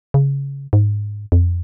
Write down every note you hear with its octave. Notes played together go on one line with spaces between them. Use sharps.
C#3
G#2
F2